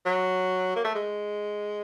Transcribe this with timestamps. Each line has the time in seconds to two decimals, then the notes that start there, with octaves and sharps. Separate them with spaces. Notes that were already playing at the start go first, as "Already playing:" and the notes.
0.05 F#3
0.76 A#3
0.85 A3
0.95 G#3